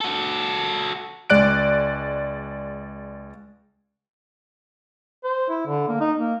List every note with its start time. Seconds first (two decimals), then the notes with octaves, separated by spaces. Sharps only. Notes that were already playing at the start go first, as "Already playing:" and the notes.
0.01 F#4 A4
1.30 C#2 G#3 D5 F#6 D7
5.24 C5
5.49 E4
5.67 D3
5.88 A#3
6.00 D#4
6.19 A#3